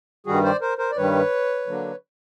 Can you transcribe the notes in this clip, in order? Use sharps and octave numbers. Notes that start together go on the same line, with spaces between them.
G2 D#3 G3 F#4 G#4
C5 D5
A#4 C5
A#4 C5
D5
G2 D#3 G3 B4 C#5
D3 F#3 A#3 D4